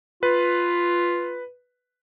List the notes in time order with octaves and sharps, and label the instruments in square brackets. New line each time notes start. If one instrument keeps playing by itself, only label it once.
[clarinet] F4 [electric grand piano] B4